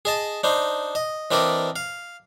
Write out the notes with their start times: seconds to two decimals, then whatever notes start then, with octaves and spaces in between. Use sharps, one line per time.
0.05 G#4 D#5 A5
0.44 D4 D#4 C5
0.95 D#5
1.31 E3 C4 D4 A#4 D5 D#5
1.76 F5